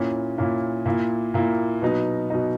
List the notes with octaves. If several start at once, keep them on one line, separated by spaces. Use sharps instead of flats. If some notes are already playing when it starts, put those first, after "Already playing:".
Already playing: A#2 A#3 C#4 E4
A#2 A#3 C#4 E4
A#2 A#3 E4
A#2 A#3 E4
B2 F#3 B3 D#4
B2 F#3 B3 D#4